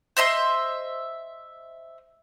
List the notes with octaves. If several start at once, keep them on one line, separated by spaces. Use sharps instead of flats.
C5 D#5 E5 C6